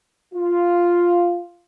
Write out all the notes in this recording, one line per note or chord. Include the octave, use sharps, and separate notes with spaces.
F4